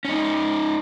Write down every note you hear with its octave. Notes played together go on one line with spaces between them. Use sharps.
C#4 D#4